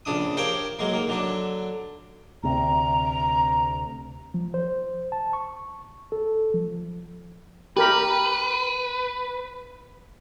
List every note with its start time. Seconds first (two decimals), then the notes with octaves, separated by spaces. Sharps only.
0.05 A#1 C#3 D4 D#6
0.37 G4 A#4 C5 C#5 F5 G5
0.79 F#3 G#3 A#3
0.93 D#3 A#3
1.07 D3 F#3 D4
2.43 D2 C3 A#5
4.34 F3
4.54 C5
5.12 A5
5.33 C#6
6.12 A4
6.54 F3
7.77 G4 A#4 B4 B5